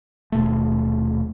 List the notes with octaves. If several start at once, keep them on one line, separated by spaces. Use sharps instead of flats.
D#1 B2 A3